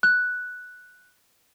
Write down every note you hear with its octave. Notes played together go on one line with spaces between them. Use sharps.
F#6